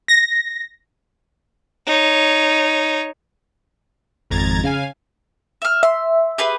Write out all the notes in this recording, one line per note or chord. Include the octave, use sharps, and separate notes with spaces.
A#6
D#4 C#5
G#1 F2 A#5 G#6 A6
C#3 F5 G#5
E5 F6
E5 C6
G4 G#4 B4